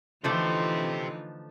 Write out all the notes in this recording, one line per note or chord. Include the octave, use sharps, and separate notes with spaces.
D3 E3 F3 A3 D#4 F4 G4 C5